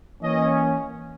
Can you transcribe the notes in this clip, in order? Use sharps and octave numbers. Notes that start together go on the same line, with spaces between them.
E3 A#3 C#4 D#5